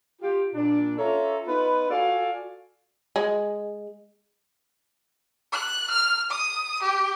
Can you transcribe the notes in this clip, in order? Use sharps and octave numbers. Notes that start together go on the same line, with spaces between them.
F4 G4
A#2 D4
C#4 F4 A4 C#5 E5 A#5
B3 D#4 F4 B4
F4 F#4 A4 D5 F5 G#5
G#3
F#6
F6
D#6
G4